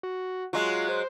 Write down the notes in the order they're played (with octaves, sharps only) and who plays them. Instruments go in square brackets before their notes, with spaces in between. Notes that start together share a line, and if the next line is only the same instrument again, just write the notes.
[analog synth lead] F#4
[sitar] F#3 G#3 [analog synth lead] F4
[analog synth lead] C5